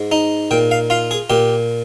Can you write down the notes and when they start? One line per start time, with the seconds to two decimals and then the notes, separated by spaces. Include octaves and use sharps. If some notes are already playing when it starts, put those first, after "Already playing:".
Already playing: G#2
0.12 D#4
0.51 A#2 G5
0.71 F5
0.90 F4 F5
1.11 G#4
1.30 A#2 G4